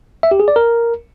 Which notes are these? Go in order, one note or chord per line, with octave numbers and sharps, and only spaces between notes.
E5
G4
G#4
D5
A#4